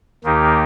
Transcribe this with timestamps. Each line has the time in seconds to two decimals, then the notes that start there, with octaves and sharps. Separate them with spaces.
0.24 D#2 D#3 A#3 D#4 G4